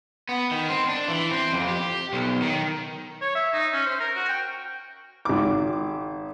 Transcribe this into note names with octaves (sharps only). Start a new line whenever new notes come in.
B3
D#3
C4
D4
E3
C4
F2
G4
B1
D#3
C#5
E5
D#4
C#4
C5
A#4
F#4
G5
G#1 D6